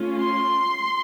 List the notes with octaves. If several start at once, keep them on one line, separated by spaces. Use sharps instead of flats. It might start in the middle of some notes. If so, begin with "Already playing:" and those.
Already playing: A3 C#4 F4
C6